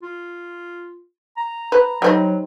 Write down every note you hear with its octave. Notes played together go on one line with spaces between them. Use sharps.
F4
A#5
B4
F#3 G3 C4 D#4